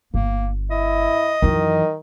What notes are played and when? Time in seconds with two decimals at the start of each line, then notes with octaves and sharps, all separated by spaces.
0.14 G1 A#3
0.71 E4 D#5
1.42 F#2 D#3 E3